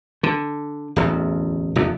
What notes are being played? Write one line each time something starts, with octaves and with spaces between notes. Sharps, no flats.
D3
D1 A1 E2
F1 E2